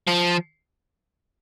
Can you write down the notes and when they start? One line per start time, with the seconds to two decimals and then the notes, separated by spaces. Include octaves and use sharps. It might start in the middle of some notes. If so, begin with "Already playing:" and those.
0.07 F3